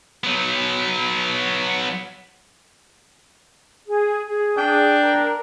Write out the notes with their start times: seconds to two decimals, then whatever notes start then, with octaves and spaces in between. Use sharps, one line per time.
0.24 F#3 B3
3.86 G#4
4.28 G#4
4.57 D4 G5 G6
5.00 A#4